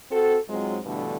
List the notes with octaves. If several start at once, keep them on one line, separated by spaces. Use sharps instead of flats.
C4 F#4 A4
G#2 F#3 G#3 C4 F4
G2 B2 D3 E3 A3